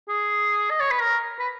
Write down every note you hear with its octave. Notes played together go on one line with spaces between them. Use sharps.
G#4
D#5
C#5
B4
A#4
B4